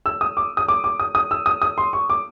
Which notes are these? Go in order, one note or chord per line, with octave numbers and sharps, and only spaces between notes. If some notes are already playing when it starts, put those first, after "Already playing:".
E6
D#6
D6
D#6
D6
D6
D#6
D#6
E6
D#6
D#6
C6
C#6
D6